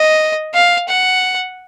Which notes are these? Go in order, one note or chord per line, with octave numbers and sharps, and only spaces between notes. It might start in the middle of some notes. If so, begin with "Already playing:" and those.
Already playing: D#5
F5
F#5